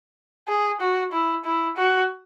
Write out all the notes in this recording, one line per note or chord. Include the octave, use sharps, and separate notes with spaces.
G#4
F#4
E4
E4
F#4